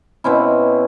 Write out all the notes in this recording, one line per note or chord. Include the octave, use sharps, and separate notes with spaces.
B2 C4 C#4 E4